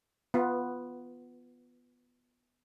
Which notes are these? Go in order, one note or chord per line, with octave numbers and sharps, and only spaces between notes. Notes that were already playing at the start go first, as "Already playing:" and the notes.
B3 F4